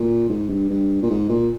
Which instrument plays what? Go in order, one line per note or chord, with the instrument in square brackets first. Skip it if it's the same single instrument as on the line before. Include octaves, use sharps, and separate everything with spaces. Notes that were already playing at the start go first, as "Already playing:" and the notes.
Already playing: [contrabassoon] A#2
G#2
G2
G2
A#2
G#2
A#2